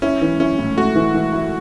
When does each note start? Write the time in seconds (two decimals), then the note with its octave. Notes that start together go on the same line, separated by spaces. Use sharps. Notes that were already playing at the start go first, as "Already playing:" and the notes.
0.02 C#4 E4
0.21 E3
0.40 C#4 E4
0.58 A2
0.77 A3 F#4
0.95 E3
1.14 E3
1.33 E4